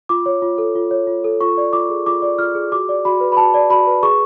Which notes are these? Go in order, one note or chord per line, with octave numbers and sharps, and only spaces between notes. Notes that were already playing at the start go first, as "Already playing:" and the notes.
F4 D6
C#5
F4
A4
F4
C#5
F4
A4
F4 C#6
D5
F4 D6
G#4
F4 D6
D5
F4 F6
G#4
F#4 D6
D5
F#4 B5
B4
B5
F#4 A5
D5
F#4 B5
B4
G#4 C#6